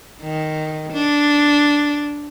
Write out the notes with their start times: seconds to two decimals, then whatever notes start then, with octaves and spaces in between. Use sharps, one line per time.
0.23 D#3
0.93 D4